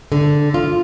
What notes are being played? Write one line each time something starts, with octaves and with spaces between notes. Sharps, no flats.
D3
F4